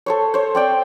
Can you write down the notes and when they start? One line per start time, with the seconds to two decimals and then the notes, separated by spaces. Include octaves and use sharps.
0.06 A4 C5 C#5
0.34 C5 C#5
0.55 C4 D5 G5